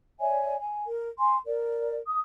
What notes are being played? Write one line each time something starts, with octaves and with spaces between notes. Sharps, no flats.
C#5 D5 E5 G#5
G#5
A#4
G#5 C6
A#4 D5
D#6